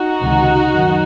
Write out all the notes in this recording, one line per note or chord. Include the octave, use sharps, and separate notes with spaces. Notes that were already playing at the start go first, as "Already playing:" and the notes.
Already playing: D#4 F#4
C#2 C3 D#3
F#2 D#3 F#3